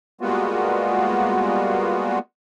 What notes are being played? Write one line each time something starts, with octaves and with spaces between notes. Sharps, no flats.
G3 G#3 A#3 B3 F4 F#4